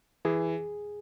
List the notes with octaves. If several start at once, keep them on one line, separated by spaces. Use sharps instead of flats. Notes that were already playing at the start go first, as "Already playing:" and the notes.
E3 G#4